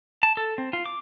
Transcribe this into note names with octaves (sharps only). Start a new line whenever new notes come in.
A5
A4
C4
F4
D6